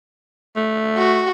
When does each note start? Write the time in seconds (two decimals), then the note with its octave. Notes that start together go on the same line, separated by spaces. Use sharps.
0.56 A3
0.97 F#4